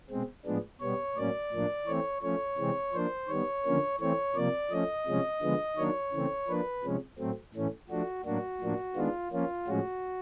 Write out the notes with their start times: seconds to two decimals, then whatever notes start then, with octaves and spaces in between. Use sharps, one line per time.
0.10 B2 G#3 C4
0.45 A2 F3 G#3 B3 D4
0.81 B2 G3 B3 C#5
1.16 A2 F#3 A#3 C#4 D5
1.52 A2 F3 A#3 D4
1.87 E3 A3 C4 C#5
2.22 F3 A3 C#4 C#5
2.58 C3 E3 G#3 C4
2.93 F3 A#3 D4 C5
3.28 D#3 G3 B3 C#5
3.65 D3 F3 A#3 C#4
4.00 E3 A3 C4 C#5
4.35 C3 F3 A#3 D5
4.71 F3 A3 C#4 D#5
5.06 C3 F3 G#3 C#4
5.41 D3 F3 G#3 B3
5.77 D#3 F#3 A#3 D4 C#5
6.12 C#3 E3 A3 C4
6.48 F3 A#3 D4 B4
6.84 C3 F3 G#3 C#4
7.18 A2 F#3 A3 C4
7.54 A2 E3 A3 C#4
7.90 F3 A3 D4 F#4
8.25 A2 F#3 A#3 D4 F#4
8.60 A2 F3 A#3 D4
8.95 D#3 G#3 B3 D4 F4
9.31 F3 A#3 C#4 F4
9.67 A2 F3 G#3 C#4 F#4